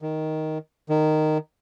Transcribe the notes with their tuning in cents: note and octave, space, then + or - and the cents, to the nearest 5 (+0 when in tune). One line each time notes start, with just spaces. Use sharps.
D#3 +5
D#3 -10